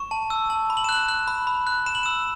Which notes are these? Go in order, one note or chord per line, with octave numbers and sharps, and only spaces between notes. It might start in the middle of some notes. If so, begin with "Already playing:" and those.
Already playing: C#6 E7
A5
E6
A5
B5
F#7
E7
F#6 F#7
F#6
B5
B5
F#6
B5 E7
F#7
E6 E7